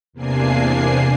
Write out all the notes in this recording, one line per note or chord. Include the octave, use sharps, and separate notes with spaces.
E2 C3 A#3 D4 G#5 C7